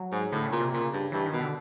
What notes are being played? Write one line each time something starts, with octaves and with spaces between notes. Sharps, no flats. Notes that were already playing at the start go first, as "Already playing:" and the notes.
Already playing: F#3
G#2
A2 D3
C#3
A#2
C3
A#2 C#3
G2
G2 E3
D#3
B2
D3